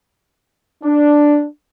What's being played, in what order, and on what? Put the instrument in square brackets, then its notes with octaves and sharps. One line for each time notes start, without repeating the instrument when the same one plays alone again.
[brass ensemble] D4